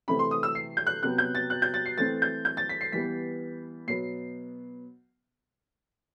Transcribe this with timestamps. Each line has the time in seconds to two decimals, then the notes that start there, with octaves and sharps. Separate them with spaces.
0.08 C3 E3 A3 C4 B5
0.19 C6
0.31 D#6
0.43 E6
0.55 C7
0.77 G6
0.87 F#6
1.03 C3 F#3 B3 F#6
1.18 G6
1.35 A6
1.50 F#6
1.62 G6
1.74 A6
1.86 C7
1.98 E3 A3 C4 A6
2.22 G6
2.45 G6
2.57 A6
2.69 B6
2.81 C7
2.92 E3 G3 B3 B6
3.87 B2 F#3 B3 C7